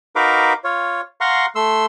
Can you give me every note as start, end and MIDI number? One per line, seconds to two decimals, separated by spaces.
0.16 0.53 63
0.16 0.53 66
0.16 0.53 70
0.16 0.53 71
0.16 0.53 77
0.16 0.53 86
0.64 1.01 65
0.64 1.01 73
1.21 1.46 77
1.21 1.46 78
1.21 1.46 82
1.21 1.46 84
1.21 1.46 85
1.55 1.86 57
1.55 1.86 84
1.55 1.86 88